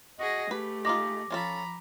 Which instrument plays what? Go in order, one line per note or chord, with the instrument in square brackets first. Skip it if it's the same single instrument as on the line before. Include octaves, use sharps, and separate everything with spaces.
[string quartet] F#4 G#4 A#6 [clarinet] D#5
[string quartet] A3 [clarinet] G4 [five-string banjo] B4
[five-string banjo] G#3 D#4 F4 [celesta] D6 A#6
[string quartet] F3 A#5 B5 [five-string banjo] C#4 F4 A4